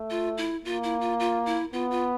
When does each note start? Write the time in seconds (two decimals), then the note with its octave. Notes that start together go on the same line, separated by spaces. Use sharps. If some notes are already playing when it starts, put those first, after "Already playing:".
Already playing: A3
0.10 F4
0.38 E4
0.64 A#3 F4
0.83 E4
1.01 F4
1.20 F4
1.46 E4
1.73 B3 F4
1.91 F4